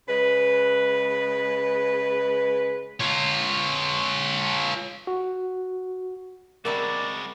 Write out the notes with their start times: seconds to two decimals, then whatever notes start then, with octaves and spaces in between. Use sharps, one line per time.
0.08 C#3 G#3 B4
3.00 F4 C#5
5.07 F#4
6.65 C3 G3 G#3 F#4 A#4 D5 E5